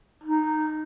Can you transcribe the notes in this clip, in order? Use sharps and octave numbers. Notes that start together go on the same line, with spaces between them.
D#4